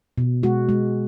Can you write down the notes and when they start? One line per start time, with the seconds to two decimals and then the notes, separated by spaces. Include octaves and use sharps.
0.18 B2
0.43 G#3 F#4
0.69 G#3